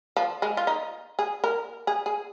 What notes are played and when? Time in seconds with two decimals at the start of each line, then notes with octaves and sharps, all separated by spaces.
0.17 F3
0.42 G#3
0.57 F4
0.67 D#4
1.19 G#4
1.44 A#4
1.87 G#4
2.06 G#4